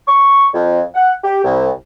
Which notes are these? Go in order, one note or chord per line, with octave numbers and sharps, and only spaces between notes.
C#6
F2
F#5
G4
C2